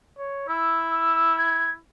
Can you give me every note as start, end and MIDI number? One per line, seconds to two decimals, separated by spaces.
0.19 0.45 73
0.49 1.78 64
0.49 0.83 88
0.91 1.36 88
1.38 1.72 92